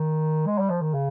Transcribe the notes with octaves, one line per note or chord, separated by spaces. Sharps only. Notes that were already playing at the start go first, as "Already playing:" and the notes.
Already playing: D#3
G#3
G3
F3
D#3
C#3